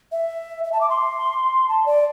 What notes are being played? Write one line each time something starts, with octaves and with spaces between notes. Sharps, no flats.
E5
E5
A5
D6
C6
A5
D5